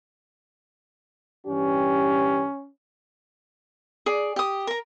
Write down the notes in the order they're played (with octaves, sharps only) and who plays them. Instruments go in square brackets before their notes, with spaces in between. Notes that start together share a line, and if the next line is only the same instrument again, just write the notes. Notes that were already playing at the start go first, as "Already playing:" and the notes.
[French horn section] G2 E3 G4 [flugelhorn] C#4
[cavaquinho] G#4 D5
G4 D#6
A#4 A#5